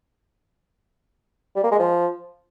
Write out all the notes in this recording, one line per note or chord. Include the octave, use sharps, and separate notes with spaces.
G3
A#3
G#3
F3